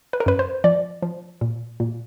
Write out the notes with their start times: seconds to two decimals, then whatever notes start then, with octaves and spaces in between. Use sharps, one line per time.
0.13 B4
0.20 A#4
0.26 F#2 B4
0.39 C5
0.64 F3 D5
1.02 F3
1.41 A#2
1.80 A#2